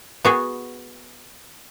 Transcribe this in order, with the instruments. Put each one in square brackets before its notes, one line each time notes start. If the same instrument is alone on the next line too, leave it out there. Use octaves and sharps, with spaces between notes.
[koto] B3 F#4 G#4